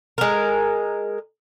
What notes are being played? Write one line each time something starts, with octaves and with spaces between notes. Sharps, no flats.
G#3 A#4